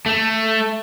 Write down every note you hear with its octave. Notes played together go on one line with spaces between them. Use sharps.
A3